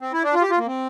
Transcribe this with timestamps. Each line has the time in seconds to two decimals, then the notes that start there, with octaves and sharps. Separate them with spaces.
0.01 C4
0.13 E4
0.23 D4
0.34 F4
0.42 G4
0.50 F4
0.58 A#3
0.67 C4